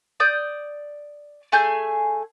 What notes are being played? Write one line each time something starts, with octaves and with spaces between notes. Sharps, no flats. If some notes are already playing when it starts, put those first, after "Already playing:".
D5 D#6 G6
A3 G#4 G#5 G6